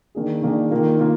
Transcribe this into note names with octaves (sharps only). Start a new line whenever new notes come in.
D#3 A#3 D4 G#4
D#3 A#3 D4 G#4
D#3 A#3 F4
A#3 F4